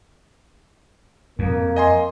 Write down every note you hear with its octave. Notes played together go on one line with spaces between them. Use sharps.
F2 A#3
D#5 G#5 C6